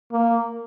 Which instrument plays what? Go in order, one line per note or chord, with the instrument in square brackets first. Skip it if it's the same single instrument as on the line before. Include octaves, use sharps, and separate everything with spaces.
[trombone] A#3